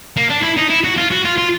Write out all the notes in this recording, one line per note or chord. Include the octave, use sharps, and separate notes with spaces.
A#3
D4
E4
D#4
E4
F#4
F4
F#4
F4
F4